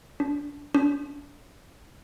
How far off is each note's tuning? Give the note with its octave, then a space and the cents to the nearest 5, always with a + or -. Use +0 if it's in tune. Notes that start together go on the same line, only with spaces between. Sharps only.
D4 -25
D4 -35